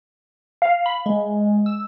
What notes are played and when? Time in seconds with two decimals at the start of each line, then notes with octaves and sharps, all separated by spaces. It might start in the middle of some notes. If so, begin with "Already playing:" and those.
0.62 F5
0.86 B5
1.06 G#3
1.66 E6